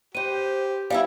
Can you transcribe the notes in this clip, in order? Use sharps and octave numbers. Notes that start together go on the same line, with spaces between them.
G4 B4 C5 D#7
G3 B3 E4 F5